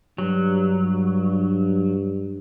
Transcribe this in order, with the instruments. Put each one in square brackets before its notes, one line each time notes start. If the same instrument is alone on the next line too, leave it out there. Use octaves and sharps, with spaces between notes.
[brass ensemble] G2 [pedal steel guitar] F#3